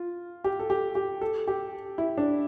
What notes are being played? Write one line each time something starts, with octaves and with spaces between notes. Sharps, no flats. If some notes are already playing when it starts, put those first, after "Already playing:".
Already playing: F4
G4
A4
G4
G4
A4
G4
E4
D4